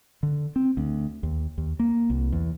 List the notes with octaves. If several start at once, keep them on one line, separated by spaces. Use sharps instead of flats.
D3
C4
D2
D#2
D#2
A#3
C2
E2